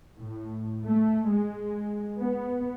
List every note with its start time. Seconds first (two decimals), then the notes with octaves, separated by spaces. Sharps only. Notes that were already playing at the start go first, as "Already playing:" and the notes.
0.18 A2
0.85 A3
1.30 G#3
2.20 B3